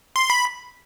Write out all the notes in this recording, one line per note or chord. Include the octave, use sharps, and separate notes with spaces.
C6
B5